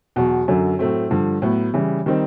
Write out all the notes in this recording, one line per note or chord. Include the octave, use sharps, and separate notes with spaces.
E2 B2 F#3
F#2 D3 F#3
A2 F#3 A3 C4
G2 D3 F3
A2 F#3 B3
C#3 E3 G3
D#3 G3 C4 D#4